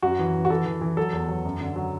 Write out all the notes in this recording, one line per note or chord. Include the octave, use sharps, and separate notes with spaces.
F#2 F#4
E3
E3
F#4
E3 A4
E3
E3
F#3 A4
E2
F#3
F#2
D3
F#3